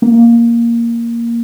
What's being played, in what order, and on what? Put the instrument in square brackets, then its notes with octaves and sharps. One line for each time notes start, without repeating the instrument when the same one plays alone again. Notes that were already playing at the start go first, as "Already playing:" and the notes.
[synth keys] A#3